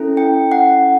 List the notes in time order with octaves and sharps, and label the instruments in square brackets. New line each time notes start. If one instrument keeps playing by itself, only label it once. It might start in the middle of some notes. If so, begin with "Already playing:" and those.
Already playing: [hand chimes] C#4 E4 A4
G5
F#5